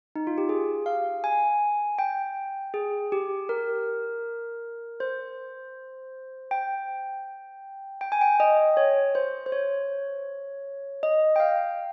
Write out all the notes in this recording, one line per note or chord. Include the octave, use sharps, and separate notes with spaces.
D#4
F4
G4
G#4
F5
G#5
G5
G#4
G4
A#4
C5
G5
G5
G#5
G5
D#5
C#5
C5
C5
C#5
D#5
G5
F5